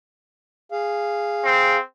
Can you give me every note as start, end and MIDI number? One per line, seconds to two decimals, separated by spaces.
0.72 1.77 68
0.72 1.77 77
1.45 1.80 60